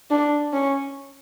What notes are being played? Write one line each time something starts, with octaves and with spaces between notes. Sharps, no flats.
D4
C#4